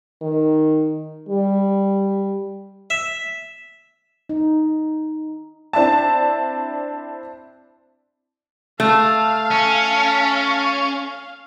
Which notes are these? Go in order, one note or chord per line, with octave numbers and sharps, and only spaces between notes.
D#3
G3
E5
D#4
C4 D4 E4 A5
A3 F5 A5
C#4